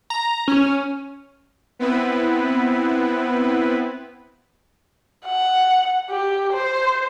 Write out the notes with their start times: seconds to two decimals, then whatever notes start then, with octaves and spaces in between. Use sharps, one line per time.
0.10 A#5
0.48 C#4
1.79 B3 C4 E4 B4
5.25 F#5
6.10 G4
6.53 C5